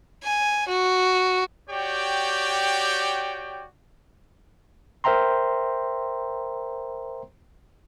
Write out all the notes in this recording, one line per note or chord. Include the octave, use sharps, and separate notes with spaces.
G#5
F#4
F#4 G4 C#5 D5 G5
A#4 C5 E5 G5 A#5 C6